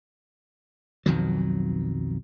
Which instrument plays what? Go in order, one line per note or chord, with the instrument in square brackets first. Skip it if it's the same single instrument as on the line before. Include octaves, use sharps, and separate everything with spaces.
[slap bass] B1 F2 D#3 F#3